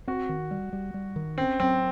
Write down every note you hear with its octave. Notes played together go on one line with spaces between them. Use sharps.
C4 F#4
D#3
G3
G3
G3
D#3
C4 C#4
F#3 C4